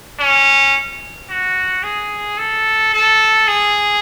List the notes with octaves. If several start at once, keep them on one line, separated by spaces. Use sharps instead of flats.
C#4
F#4
G#4
A4
A4
G#4